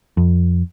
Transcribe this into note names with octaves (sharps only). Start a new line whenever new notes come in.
F2